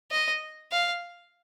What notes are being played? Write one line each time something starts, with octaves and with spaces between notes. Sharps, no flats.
D#5
F5